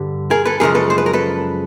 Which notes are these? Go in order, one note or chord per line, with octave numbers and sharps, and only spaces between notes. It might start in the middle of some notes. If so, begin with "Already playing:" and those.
Already playing: G2 D3 G3
G#4 A#4
A4 B4
F#2 C#3 F3 G#3 G#4 A#4
A4 B4
C5
B4
A#4
A4 B4